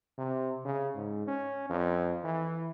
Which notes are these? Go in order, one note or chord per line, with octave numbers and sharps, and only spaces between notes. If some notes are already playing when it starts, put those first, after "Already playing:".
C3
C#3
G#2
C#4
F2
E3